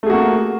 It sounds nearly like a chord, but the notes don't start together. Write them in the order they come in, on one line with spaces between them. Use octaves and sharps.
A3 G#4 F#4 A#3